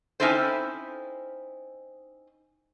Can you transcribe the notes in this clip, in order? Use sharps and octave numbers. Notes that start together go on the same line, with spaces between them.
C4 C#4 D#4 E4 A4 C5